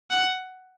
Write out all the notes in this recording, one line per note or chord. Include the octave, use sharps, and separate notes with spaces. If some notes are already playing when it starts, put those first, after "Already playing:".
F#5